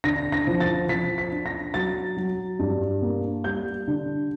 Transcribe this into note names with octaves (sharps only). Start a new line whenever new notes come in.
D3 A#6
A#6
F3
A6
F3 B6
B6
D4
A#6
F#3 A6
F#3
G2
A#3
G3 G6
D3